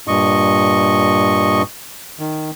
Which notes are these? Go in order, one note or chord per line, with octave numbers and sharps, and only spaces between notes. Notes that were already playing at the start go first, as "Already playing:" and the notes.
G2 A#2 D#5 C#6
D#3